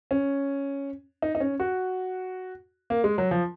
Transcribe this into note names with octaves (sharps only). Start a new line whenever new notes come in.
C#4
D#4
D#4
C#4
F#4
A#3
G#3
F#3
F3